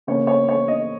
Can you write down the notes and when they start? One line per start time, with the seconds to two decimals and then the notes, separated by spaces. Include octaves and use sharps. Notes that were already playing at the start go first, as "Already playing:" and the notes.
0.07 C#3 A#3 C#5
0.27 C#5
0.48 C#5
0.68 D#5